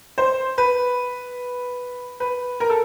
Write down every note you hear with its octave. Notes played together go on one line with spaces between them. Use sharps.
C5
B4
B4
A#4
A4